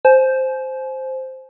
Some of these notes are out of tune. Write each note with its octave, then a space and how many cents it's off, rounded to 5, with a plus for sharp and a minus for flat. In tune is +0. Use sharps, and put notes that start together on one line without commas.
C5 +0 G#5 +40